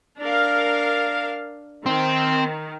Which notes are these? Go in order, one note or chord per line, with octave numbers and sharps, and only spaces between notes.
D4 A#4 F5
D#3 C4